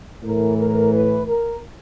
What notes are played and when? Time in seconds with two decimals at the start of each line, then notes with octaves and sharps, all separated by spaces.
0.23 A2 E3 A#4
0.58 A#4
0.92 B4
1.27 A#4